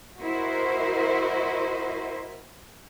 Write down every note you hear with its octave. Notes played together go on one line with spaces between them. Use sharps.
E4 F#4 A#4 C5 D#5 E5